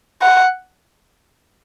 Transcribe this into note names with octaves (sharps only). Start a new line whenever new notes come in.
F#5